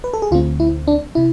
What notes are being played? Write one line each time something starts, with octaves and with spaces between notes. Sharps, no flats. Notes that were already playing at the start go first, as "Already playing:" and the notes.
B4
A4
G#4
D2 D3 A3 C4 F4
E4
D4
C3 E4